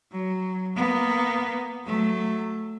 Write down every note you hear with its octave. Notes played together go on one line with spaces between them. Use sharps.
F#3
A#3 B3
F#3 A3